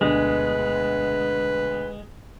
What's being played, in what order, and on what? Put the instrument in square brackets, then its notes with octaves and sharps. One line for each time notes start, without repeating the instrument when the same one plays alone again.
[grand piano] D2 B2 D3 [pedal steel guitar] G#3 [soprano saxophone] B4